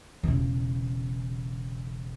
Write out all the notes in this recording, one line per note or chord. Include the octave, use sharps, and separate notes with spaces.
E1 C#3